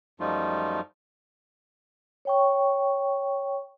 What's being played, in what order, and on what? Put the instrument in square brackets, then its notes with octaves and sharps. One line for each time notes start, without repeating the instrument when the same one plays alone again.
[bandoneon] F#2 F3 G3 A3 D#4 F4
[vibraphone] C#5 G5 C#6